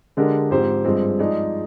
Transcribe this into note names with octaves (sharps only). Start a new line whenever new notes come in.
D3 G#3 D4 G4 A#4
G#2 F3 C4 G4 C5
G2 F3 G#3 C4
F3 G#3 D#4 G#4 D5